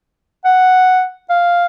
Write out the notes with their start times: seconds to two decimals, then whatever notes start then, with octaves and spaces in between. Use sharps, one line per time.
0.45 F#5
1.30 F5